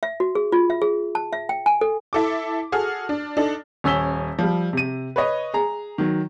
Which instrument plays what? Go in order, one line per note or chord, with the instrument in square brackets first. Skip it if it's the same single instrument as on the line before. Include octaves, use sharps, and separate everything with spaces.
[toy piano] E5
F#4
G#4
F4
E5
G#4
A5
E5
G5
G#5
A4
[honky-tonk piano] E4 A4 D6
F#4 G#4 A4 F6
D4
D4 D#4 A4
[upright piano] D#1 C#4 G#5 E6 B6 G7
F3 G3
C3 D#7
B4 C#5 D#5
G#4 A#5
D#3 F#3